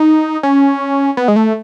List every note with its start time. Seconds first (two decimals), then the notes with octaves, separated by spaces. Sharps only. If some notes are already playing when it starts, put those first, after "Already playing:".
Already playing: D#4
0.43 C#4
1.17 B3
1.28 G#3
1.36 A3